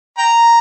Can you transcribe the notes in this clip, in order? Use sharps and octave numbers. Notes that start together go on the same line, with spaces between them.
G5 A#5